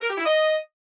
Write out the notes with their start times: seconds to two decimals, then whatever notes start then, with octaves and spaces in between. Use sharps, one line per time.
0.02 A#4
0.10 G4
0.18 E4
0.26 D#5